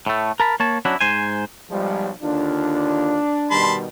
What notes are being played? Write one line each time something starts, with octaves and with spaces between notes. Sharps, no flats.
A2 A3
A#4 A5 B5
A#3 C#5 A5
F#3 B3 C#4 D4 E4 F#4
G#2 C5 G#5
B1 F3 G3 G#3
D#2 D3 D4 F4
B2 D#3 G3 A5 B5 C6